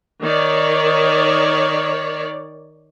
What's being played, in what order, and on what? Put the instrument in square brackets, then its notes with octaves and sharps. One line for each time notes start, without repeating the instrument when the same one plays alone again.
[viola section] D#3 C#5 D5